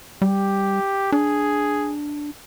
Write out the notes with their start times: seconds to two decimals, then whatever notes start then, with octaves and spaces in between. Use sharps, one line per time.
0.22 G3 G4
1.12 D4 G#4